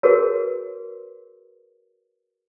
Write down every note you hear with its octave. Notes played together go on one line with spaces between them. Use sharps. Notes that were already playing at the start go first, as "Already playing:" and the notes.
F#4 G#4 A#4 B4 C#5